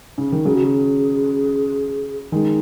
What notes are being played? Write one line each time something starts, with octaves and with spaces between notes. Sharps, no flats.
C#3
D#3
C#3 F#3 G#4
F#4
G#4
D#3 G#3 D#4